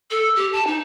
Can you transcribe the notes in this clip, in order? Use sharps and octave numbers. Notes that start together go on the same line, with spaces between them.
A4
G4
A5
D#4